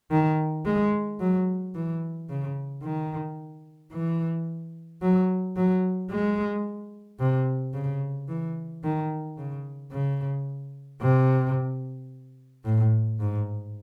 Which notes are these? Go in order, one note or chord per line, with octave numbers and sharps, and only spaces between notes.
D#3
G#3
F#3
E3
C#3
D#3
E3
F#3
F#3
G#3
C3
C#3
E3
D#3
C#3
C#3
C3
A2
G#2